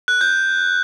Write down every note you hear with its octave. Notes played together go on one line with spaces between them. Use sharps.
F#6
G6